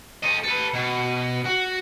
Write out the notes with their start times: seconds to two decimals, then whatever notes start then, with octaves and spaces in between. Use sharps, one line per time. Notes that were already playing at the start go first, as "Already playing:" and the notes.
0.23 A4 D#5
0.43 A4 B4
0.74 B2
1.45 F#4